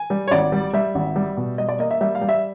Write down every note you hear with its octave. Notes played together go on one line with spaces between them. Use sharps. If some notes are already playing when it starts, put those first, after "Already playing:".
Already playing: G#5
G3
C#5
G#1 D5
G3
G3 E5
G#1
G3
B2
G3 D#5
D5
A#3 D#5
E5
G3 E5
F5
G3
E5